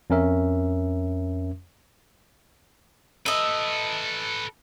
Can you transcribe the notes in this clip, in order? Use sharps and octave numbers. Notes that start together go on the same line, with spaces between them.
F2 C#4 A#4 E5
A4 B4 D#5 E5